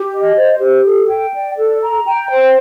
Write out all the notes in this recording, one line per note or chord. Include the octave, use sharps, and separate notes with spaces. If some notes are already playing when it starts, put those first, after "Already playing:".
Already playing: G4
D#5
C5
G4
A4
G5
D5
A4
A#5
G5
C5